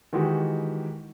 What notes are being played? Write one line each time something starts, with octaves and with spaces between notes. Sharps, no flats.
D#3 E3 G#3 F#4 G4